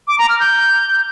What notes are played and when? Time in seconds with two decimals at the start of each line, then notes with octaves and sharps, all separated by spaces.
0.08 D6
0.18 A#5
0.29 F6
0.40 G6